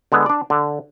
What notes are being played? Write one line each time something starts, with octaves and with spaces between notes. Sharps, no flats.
D3 G#3 B3
D4 D5
D3